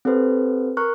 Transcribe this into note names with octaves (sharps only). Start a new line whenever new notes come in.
C4 G4 A4 B4 C5
A#4 A#5 C#6 F6 F#6